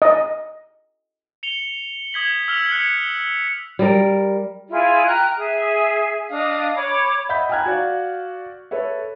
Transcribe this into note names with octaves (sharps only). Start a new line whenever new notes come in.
D#5
C#7 F7 G7
D#6 G#6 B6 F#7
E6 F6 B6 F7
F#6 G#6 C#7
G3 A#4
E4 F4 G#4
G5 A#5 F6 F#6
G#4 E5
D4 D#5 F5 D#6
C#5 B5 D6
D#5 E5 F#5 B5 G6 B6
G5 G#5 A#5 F6 F#6 G#6
F#4 D5 F5
A4 B4 C#5 E5